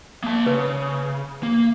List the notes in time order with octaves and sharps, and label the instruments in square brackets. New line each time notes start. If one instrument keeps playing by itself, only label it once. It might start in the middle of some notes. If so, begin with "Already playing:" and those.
[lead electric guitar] A#3 A5
[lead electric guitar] C#3 [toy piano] B4
[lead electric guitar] A#3